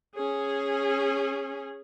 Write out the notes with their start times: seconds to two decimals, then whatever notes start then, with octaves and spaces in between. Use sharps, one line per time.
0.15 C#4 G#4